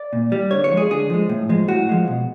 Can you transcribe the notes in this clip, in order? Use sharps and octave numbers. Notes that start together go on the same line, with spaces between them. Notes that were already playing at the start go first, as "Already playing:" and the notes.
Already playing: D5
A#2
G3
D3 C#5
C#5
F3 G#3
G#4
D3 G#4
F3 G#3
A2
F3 G#3
A2 F#4
F3 G#3
B2